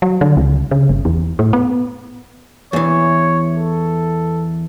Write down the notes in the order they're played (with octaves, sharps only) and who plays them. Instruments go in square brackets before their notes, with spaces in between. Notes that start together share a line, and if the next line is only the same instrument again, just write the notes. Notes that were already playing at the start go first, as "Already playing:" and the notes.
[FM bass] F#3
D3
C#2
C#3
G1
E2
A2
B3
[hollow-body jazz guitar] E2 E3 [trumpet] C#5
[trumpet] A4